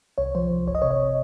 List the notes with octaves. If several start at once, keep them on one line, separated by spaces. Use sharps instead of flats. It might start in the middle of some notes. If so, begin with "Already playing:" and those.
C2 C#5
F3 C5
C2
G1 C#5
D#5
C3 C#5
D#5